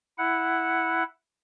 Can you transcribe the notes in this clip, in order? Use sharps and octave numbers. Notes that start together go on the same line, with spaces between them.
E4 F#5